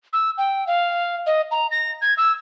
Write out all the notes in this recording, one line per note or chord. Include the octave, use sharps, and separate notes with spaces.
E6
G5
F5
D#5
A#5
A#6
G#6
E6